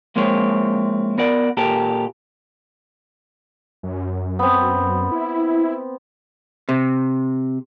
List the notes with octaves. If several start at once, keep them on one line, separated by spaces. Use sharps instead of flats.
F3 G#3 A#3 C4 E4 C#5
B3 A#4 D5 F#5
A#2 G4 A4 A#4
F#2
B3 C4
E4
C3